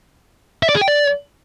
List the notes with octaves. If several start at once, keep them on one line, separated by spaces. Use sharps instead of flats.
E5
D5
G#4
G5
D5